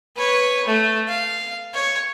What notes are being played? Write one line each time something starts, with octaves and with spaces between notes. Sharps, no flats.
B4 C#5
A3
F5
C#5